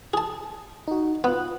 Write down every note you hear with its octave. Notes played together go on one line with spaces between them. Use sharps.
G#4 A5
D#4 F#4
B3 F4 F#6